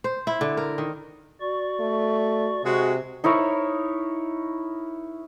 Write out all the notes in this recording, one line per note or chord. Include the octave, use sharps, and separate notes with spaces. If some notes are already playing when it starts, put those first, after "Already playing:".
C5
E4
D3
A#4
D#3
F#4 D5 C#6
A3
C3 G#3 F#4
D#4 E4 A#4 C#5